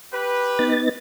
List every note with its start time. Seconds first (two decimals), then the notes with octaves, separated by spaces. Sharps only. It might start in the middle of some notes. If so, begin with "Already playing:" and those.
0.14 G4 B4
0.59 B3 D#4 A6